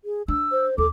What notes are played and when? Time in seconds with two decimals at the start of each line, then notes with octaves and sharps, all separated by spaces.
0.04 G#4
0.28 D4 E6
0.52 C5
0.78 D#2 A4 D6